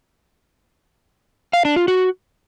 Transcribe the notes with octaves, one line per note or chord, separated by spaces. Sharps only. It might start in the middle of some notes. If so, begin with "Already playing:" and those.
F5
D4
F4
F#4